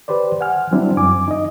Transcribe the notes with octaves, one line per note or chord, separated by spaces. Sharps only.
G4 B4 C5 D5
F#5 G#5 F6
F#3 G3 C4 D4 E4
F#2 G#5 D6
D#4 D#5